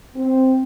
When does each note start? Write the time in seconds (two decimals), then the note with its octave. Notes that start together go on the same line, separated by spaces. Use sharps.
0.16 C4